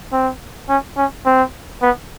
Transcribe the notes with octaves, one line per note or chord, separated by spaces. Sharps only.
C4
C#4
C#4
C4
B3